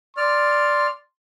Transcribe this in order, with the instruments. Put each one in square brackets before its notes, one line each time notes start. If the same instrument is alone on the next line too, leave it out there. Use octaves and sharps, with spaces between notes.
[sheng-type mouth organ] D5 F6 [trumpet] C6